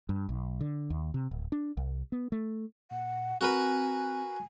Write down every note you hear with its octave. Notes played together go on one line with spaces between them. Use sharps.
G2
B1
D3
D#2
C3
D1
D4
C2
B3
A3
A#2 F#5
C4 F#4 A#4 B4 G#5